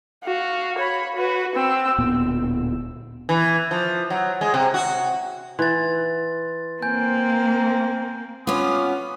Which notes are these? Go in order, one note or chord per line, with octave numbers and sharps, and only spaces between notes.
F#4 F5
C#5 B5
F#4 B4
C4 E6
D1 A#2 B3
E3
F3
F#3
G#3
C3
F#4
E3 C6 A6
A#3 C4 G#5 G6
B3 C#4 F4 F#4 D6